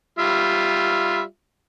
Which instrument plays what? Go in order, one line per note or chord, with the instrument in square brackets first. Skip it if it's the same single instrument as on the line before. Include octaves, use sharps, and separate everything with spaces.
[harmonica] G3 F4 E5